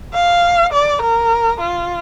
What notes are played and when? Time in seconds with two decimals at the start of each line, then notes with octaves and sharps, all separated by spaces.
0.13 F5
0.72 D5
1.02 A#4
1.60 F4